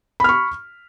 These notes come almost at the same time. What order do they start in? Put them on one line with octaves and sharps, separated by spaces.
B5 F6 C#6